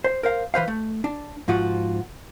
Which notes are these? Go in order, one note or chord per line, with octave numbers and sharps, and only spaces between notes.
C5
A#4 C5 F5
E3 B4 C5 F5
A3
D4
G#2 F3 F4 F#4